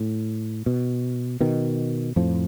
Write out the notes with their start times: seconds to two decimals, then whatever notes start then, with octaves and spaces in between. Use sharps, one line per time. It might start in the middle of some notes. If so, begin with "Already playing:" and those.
Already playing: A2
0.66 B2
1.41 B2 D#3
2.16 F2 A2 F3